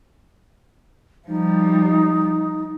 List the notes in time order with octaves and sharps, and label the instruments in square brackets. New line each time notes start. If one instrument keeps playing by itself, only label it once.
[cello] F3 G3 [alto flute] D#4